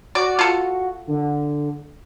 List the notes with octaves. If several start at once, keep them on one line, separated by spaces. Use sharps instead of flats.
F#4 D5
F4 A4
D3